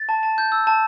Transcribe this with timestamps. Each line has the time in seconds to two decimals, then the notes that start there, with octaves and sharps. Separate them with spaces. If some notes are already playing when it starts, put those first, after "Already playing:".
Already playing: A6
0.09 A5
0.23 A5
0.38 G6
0.52 E6
0.67 A5